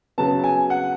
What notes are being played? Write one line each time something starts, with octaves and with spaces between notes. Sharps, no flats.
C#3 F#3 B3 A5
G#5
F#5